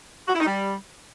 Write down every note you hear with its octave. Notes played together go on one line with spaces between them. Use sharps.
F#4
E4
D#4
G3